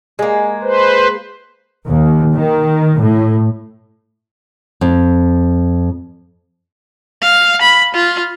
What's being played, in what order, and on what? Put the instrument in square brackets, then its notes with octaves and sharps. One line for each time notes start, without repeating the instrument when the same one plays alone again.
[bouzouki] G#3 A#3
[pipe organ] B4 C5
[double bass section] D#2
D#3
A2
[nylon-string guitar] F2
[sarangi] F5
B5
F4